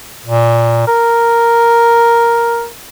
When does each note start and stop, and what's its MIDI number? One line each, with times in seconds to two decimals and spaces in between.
0.26 0.85 46
0.87 2.68 70